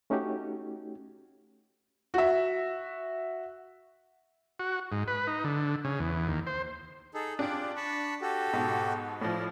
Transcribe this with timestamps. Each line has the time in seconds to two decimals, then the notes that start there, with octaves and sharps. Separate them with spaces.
0.10 A3 C#4 D#4 F#4 G4
2.14 F#4 E5
4.60 F#4
4.92 G#2
5.08 B4
5.27 D#4
5.44 D3
5.85 C#3
6.00 E2
6.28 D#2
6.47 C5
7.14 D#4 G#4 A4
7.39 D4 F4 G4 G#4 D7
7.77 A5 B5 C#6
8.21 F#4 G4 A4
8.53 G#2 B2
9.21 A2 F3 D5 D#5